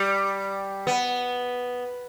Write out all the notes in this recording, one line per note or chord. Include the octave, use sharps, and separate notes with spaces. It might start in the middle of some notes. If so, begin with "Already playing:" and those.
Already playing: G3
B3